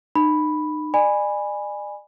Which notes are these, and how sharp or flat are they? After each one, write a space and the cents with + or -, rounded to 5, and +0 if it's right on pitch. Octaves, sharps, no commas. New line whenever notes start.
D#4 -35 B5 +0
D5 +40 G#5 -10 B5 +0